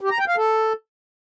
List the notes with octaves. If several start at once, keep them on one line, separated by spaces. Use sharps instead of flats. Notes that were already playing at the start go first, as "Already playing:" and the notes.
G4
A#5
G5
F5
A4